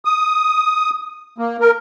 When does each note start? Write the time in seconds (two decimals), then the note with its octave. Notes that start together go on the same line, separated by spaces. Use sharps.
0.05 D#6
1.38 A#3
1.60 A#4